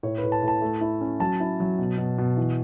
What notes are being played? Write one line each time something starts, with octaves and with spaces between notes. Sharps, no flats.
A2 C#5
A2 B4
A5
A2
A5
A3
E4
C#4
F#3 A5
E4
F#3
B2
B2
B2
E3